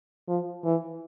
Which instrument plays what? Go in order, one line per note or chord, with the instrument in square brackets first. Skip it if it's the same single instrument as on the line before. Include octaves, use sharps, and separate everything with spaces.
[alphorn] F3
E3